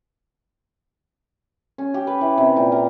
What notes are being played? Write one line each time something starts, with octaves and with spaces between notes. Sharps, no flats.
C#4
G4
B4
E3
C3
A#2
A#4